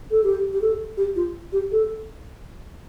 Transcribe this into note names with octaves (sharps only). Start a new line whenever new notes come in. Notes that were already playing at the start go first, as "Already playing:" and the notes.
A4
G4
G4
A4
G4
F4
G4
A4